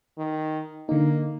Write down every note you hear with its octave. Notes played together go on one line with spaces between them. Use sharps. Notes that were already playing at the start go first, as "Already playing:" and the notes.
D#3
D3 A#3 D#4